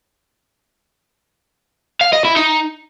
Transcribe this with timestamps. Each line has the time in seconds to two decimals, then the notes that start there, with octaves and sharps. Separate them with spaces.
2.01 F5
2.13 D#5
2.25 E4
2.36 D#4